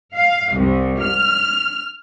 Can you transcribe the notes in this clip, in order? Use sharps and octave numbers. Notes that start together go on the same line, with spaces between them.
F5
C2
F6